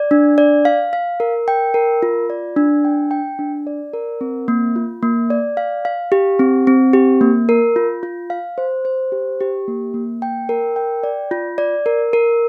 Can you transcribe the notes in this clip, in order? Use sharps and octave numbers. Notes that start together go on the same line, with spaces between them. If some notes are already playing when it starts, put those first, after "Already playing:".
Already playing: D5
D4
D5
F5
F5
A#4
G5
A#4
F4
D5
D4
G5
G5
D4
D5
A#4
C4
A#3
F4
A#3
D5
F5
F5
G4
C4
C4
G4
A#3
A#4
F4
F4
F5
C5
C5
G4
G4
A#3
A#3
G5
A#4
G5
D5
F4
D5
A#4
A#4